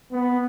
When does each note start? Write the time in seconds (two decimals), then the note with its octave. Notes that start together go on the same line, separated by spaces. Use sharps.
0.13 B3